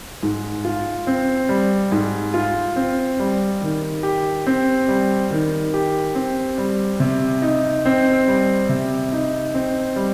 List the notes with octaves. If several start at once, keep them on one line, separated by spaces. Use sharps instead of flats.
G#2
F4
C4
G3
G#2
F4
C4
G3
D#3
G4
C4
G3
D#3
G4
C4
G3
C3
D#4
C4
G3
C3
D#4
C4
G3